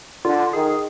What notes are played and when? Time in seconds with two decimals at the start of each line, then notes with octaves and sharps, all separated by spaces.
0.25 D3 F4
0.53 D#3 G#4